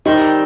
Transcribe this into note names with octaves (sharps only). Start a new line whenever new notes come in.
D#3 G3 C4 D#4